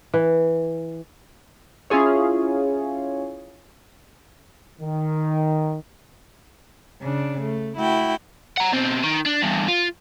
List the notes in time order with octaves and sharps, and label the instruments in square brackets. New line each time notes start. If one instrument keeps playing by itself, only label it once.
[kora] E3
[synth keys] C#4 E4 F4 G#4 C#5
[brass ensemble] D#3
[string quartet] C#3 D4
A3
A3 E4 F#4 G5
[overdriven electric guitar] F#5 A#5
B2 C4
D#3
D4
E2 G2
F4